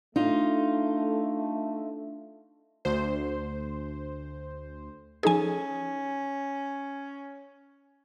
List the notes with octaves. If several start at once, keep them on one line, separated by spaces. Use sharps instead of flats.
A3 D4 D#4 F4
D2 C5
F3 C#4 D#4 G#4 A4 G#5